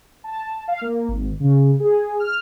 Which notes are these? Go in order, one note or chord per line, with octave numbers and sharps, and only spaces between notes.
A5
F5
A#3
G#1
C#3
G#4
F6